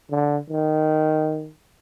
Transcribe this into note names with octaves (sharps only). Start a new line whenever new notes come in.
D3
D#3